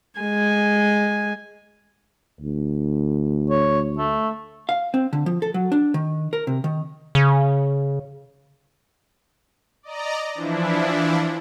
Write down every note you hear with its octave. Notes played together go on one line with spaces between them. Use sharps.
G#3 G#5
D2
C#5
A3
F5
C4
D3
F3
A4
F#3
D4
D#3
A#4
C3
D#3
C#3
D5 D#5 A#5
E3 F3 D4 E4